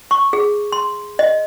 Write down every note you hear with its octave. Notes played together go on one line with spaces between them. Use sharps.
C#6
G#4
C6
D#5